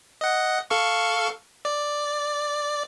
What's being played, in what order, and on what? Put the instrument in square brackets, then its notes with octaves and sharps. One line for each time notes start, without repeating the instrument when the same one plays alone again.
[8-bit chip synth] D#5 F#5
A4 F5 C#6
D5